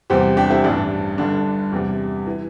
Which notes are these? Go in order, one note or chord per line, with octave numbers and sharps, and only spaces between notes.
E2 C3 G3 G4 C5
D4 G4
C4 E4
A1 G2 G3 D4
G1 G2 D3 D4
E2 C3 G3
E3